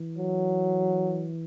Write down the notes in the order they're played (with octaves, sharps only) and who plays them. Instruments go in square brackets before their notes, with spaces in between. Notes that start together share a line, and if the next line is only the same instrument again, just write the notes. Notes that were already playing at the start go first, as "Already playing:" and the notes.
Already playing: [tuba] E3
[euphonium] F#3